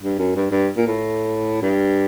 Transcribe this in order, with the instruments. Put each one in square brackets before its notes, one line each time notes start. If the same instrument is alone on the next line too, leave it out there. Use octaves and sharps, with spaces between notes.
[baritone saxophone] G2
F#2
G2
G2
A#2
A2
G2